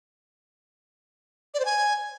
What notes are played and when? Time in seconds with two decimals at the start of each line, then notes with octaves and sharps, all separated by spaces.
1.54 D5
1.60 C5
1.65 G#5